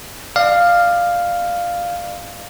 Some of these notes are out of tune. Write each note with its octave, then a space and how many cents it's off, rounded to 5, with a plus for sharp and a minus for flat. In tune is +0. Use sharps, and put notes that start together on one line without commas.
D5 +35 F5 +0